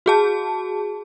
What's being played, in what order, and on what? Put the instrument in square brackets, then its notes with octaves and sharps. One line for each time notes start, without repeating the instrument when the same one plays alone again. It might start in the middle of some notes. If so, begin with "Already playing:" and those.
[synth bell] F#4 G#4 A5